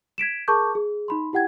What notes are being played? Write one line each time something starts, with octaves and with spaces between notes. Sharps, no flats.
G#6 B6 D7 E7
G#4 A#4 A5 C#6 D6 G6
G#4
D#4 B5 C6
E4 G4 F#5 G5 G#6